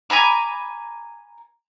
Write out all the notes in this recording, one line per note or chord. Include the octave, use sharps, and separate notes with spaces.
G#5 A#5 B5 D6